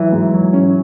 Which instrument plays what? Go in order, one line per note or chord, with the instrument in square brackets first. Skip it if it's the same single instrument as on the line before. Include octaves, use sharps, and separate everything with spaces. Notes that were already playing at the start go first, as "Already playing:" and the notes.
Already playing: [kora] E3 [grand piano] F#3
[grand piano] G#2
F#3
C#4